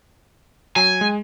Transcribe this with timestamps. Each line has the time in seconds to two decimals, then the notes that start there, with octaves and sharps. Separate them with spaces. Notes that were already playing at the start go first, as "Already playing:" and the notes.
0.76 F#3 G#5
1.01 G#3